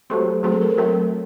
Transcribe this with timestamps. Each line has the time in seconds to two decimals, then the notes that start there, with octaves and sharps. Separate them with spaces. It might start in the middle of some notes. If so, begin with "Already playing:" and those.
0.10 F#3 A3 C4 G4
0.43 F#3 A3 C4 G#4
0.52 A4
0.61 A#4
0.70 A4
0.78 F#3 A3 C4 A#4